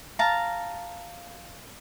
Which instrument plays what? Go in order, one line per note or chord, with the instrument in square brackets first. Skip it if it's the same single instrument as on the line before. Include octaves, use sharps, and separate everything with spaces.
[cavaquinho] F5 A5 A#5